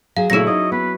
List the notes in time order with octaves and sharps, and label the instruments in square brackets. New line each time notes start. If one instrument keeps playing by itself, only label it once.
[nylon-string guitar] F#3 G#4 [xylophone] F5
[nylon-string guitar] A#2 C#3 A3 [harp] F#3 C#4 E4 [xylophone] G#4 A#6
[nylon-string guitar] D#4 C5 [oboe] D#5
[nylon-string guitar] B3 [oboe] B4